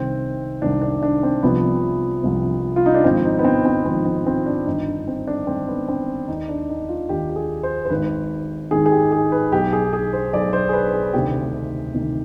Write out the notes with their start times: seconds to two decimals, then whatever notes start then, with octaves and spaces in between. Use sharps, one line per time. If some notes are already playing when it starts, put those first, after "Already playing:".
Already playing: C2 C3 D#3 C4
0.62 C2 C3 D#3 D4
0.82 D4
1.03 D4
1.23 C4
1.43 C2 C3 F3 B3
2.23 C2 C3 F3
2.76 F4
2.86 D#4
2.95 D4
3.04 G#1 G#2 F3 C4
3.25 D#4
3.39 B3
3.45 C4
3.66 C4
3.85 G#1 G#2 F3 C4
4.05 C4
4.27 C4
4.46 D4
4.67 G1 G2 D#3 D#4
4.86 D4
5.08 C4
5.27 D4
5.47 G1 G2 D#3 C4
5.68 B3
5.88 C4
6.28 D#2 D#3 D#4
6.49 D4
6.69 D#4
6.89 F4
7.09 D#2 D#3 G4
7.30 G4
7.36 G#4
7.63 C5
7.86 C5
7.90 G#1 G#2 D#3 B4
8.71 G#1 G#2 D#3 G#4
8.86 G#4
8.92 G4
9.12 G#4
9.32 B4
9.52 B1 B2 G4
9.73 G#4
9.93 G#4
10.13 C5
10.33 B1 B2 D5
10.53 C5
10.69 G#4
10.73 B4
10.88 B4
10.94 G#4
11.13 D2 C3 D#3 G4
11.95 D2 C3 D#3